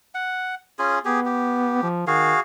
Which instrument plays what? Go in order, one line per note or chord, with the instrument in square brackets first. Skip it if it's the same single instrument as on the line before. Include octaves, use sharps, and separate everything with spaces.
[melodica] F#5
C#4 F4 G#4
[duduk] B3 [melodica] G4 G#4
[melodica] G4
[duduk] F3
[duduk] D#3 [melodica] F#4 G#4 F5